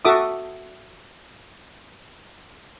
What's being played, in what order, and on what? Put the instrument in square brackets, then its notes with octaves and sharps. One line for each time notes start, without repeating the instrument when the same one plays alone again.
[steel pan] F#4 A4 E5 D6 D#6